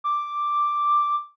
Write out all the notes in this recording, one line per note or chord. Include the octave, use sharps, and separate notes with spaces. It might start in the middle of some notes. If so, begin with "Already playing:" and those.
D6